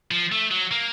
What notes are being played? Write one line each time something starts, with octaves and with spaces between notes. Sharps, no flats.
F3
A3
F#3
A#3